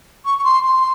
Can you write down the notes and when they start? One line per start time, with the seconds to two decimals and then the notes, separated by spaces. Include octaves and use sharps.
0.25 C#6
0.38 C#6
0.44 C6
0.63 C6